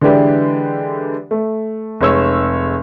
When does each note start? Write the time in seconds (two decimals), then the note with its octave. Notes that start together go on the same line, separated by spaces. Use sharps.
0.01 D3 E3 G#3 D4 G4 B4
1.31 A3
2.01 F1 G#3 C#5 E6